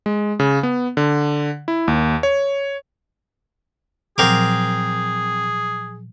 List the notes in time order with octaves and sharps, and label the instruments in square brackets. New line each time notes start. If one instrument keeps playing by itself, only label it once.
[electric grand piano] G#3
C#3
B3
D3
E4
D#2
C#5
[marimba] A#2 F3 F#3 [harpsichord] C4 A#4 D6 [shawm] G#4